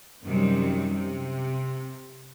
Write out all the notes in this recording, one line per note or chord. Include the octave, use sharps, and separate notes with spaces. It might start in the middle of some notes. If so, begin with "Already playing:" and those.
F#2 C3 D#3 G3
C3